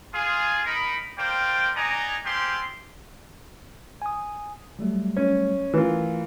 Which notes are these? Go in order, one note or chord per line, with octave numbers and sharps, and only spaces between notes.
F4 G#4
D#4 A#4 B5
A#4 C5 D5 F5 G5
B3 D#4 D5 D#5 G#5 A#5
C4 F4 G4 G#4 G5 C6
G#5 D#6
F#3 G3 A3
C#4
E3 A3 F4 A#4